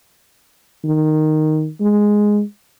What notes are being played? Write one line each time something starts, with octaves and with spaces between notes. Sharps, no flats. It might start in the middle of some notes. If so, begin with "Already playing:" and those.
D#3
G#3